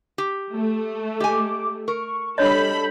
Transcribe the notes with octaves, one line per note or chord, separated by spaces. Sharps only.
G4
A3
G4 D#5 G#5 D6
A#4 C#6
G3 D4 A4 C#5 D#5 B5 G6